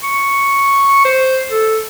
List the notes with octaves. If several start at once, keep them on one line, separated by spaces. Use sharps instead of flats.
C#6
C5
A4